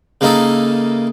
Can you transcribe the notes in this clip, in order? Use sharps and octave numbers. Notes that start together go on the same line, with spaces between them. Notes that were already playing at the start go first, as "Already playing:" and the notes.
C#3 A#3 D#4 E4 A4